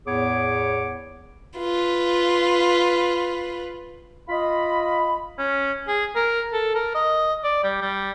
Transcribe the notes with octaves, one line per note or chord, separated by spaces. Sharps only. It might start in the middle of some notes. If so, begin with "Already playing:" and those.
E2 A2 B3 G#4 C#5 D6
F4 B4
F4 D#5 B5
C#4
G#4
A#4
A4
A#4
D#5
D5
G3
G3